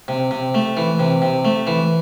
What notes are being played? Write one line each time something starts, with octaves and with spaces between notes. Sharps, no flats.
C3
C3
A3
E3
C3
C3
A3
E3